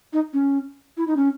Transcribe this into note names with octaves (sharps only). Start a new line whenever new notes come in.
D#4
C#4
E4
D#4
C#4